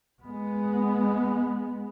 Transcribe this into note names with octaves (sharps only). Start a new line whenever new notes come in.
G#3 B3